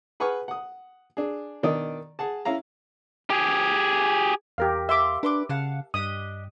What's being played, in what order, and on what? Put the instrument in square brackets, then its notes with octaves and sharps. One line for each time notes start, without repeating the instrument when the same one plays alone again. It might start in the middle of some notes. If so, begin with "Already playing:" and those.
[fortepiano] G#4 B4 F#5 G#5 C#6 F6
F#5 D#6
D4 G#4
B2 D#3 D4 D5 D#6
G#4 F#5 A5
C#4 E4 F5 A#5
[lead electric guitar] G4 G#4
[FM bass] E2 [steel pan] G4 A#4 F5
[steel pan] E5 [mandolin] F5 C6 D6
[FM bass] D4 [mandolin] B4 C6 D6
[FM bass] C#3 [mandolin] F5 F#5 A5
[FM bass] G2 [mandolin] D4 G4 D#5 [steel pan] D#6